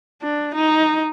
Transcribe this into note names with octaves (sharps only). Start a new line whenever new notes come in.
D4
D#4